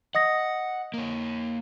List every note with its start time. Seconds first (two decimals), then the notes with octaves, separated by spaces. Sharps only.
0.15 D#5 F#5 D#6 A#6
0.94 A#3 C#5